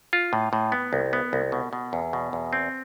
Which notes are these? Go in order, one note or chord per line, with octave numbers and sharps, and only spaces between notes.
F4
A2
A2
B3
C2
B3
C2
B2
B2
E2
B2
E2
C4